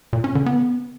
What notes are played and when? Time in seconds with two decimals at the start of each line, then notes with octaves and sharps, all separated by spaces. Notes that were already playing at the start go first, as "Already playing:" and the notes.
0.13 A#2
0.24 C#4
0.35 D3
0.46 B3